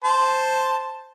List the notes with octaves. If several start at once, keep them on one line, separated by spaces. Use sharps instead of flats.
C5 A5 C6